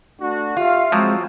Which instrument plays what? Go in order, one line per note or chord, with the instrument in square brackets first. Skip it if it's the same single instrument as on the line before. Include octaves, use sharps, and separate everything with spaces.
[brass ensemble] A3 D4 F#4
[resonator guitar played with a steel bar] F4 [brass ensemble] G4 E5 F5
[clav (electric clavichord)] F3 F#3 [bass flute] G#3 [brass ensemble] C4